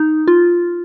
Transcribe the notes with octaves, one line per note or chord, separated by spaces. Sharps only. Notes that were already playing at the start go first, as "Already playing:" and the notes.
Already playing: D#4
F4